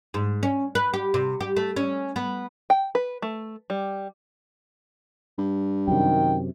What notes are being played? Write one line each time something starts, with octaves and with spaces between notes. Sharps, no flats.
G#2
C#4
B4
G4
C3
G4
A3
C#4
B3
G5
B4
A3
G3
G2
F#2 C3 D#3 G5